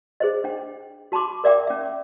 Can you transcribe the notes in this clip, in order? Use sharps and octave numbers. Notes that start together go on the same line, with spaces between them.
G#4 C5 D#5
D4 G5
F#4 A5 B5 C6 D6
A#4 D5 E5 G5 D6
C#4 E5